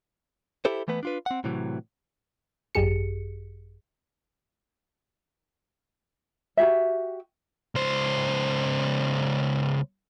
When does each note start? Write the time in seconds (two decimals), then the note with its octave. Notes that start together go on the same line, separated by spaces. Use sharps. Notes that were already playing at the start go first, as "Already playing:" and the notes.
0.65 E4 G4 A4 C5
0.88 E3 A3 B3 B4
1.03 D4 F4 B4
1.26 C4 F#5
1.44 A2 C3 E3 F#3
2.75 G#1 F#2 G4 G#4 C#7
6.57 F#4 G4 E5
7.75 C#2 C5